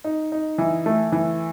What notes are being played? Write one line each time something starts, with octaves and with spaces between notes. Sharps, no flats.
D#4
D#4
E3
A3
E3